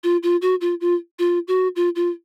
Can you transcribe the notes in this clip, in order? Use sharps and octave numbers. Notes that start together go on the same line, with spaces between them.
F4
F4
F#4
F4
F4
F4
F#4
F4
F4